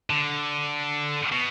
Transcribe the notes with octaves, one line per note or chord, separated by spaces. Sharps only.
D3
B2